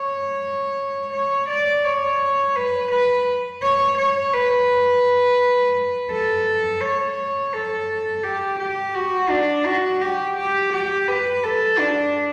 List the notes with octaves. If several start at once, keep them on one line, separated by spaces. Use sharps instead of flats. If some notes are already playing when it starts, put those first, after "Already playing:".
Already playing: C#5
C#5
D5
C#5
B4
B4
C#5
C#5
B4
A4
C#5
A4
G4
G4
F#4
D4
F#4
G4
G4
G4
B4
A4
D4